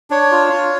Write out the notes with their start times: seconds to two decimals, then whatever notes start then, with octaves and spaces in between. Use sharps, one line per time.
0.10 D4 C#5
0.32 F4
0.53 F4